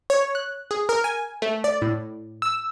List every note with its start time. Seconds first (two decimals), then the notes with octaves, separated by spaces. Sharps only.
0.10 C#5
0.35 F#6
0.71 G#4
0.89 A#4
1.04 G#5
1.42 A3
1.64 D5
1.82 A2
2.42 E6